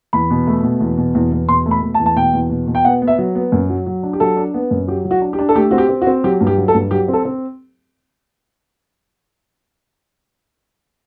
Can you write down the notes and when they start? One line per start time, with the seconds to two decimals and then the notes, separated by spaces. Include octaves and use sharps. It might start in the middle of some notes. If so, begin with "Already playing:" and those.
0.13 E2 B5
0.30 B2
0.47 A3
0.63 B2
0.81 E2
0.98 B2
1.15 E2
1.32 E2
1.49 B2 C6
1.66 A3
1.71 B5
1.82 A3
1.94 A5
2.00 E2
2.06 A5
2.16 B2 G5
2.33 E2
2.50 B2
2.67 B2
2.75 G5
2.85 B3 F#5
3.02 B3
3.08 E5
3.18 F#3
3.35 B3
3.52 F#2
3.70 F#3
3.86 F#3
4.03 D4
4.13 G4
4.20 F#3 A4
4.37 D4
4.54 B3
4.71 F#2
4.88 F#3 G4
5.05 F#3
5.11 F#4
5.22 D4
5.33 G4
5.39 D4
5.49 A4
5.55 A3 G4
5.71 C4 F#4
5.78 G4
5.89 C4
6.02 F#4
6.07 C4
6.24 F#3 G4
6.41 G2
6.47 G4
6.58 F#3
6.68 A4
6.74 G2
6.91 F#3 G4
7.08 C4
7.13 A4
7.25 C4